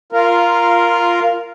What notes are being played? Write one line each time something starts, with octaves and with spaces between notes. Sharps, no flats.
F4 A#4